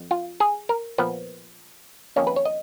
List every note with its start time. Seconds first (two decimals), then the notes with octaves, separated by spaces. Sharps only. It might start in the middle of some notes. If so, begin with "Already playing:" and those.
Already playing: F2
0.11 F4
0.40 G#4
0.69 A#4
0.98 A#2 F3 B3 B4
2.16 F2 D#3 A#3 C#4 C#5
2.27 B4
2.36 C#5
2.45 D#5